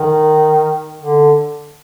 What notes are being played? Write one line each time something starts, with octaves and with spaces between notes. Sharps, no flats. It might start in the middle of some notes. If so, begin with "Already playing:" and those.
Already playing: D#3
D3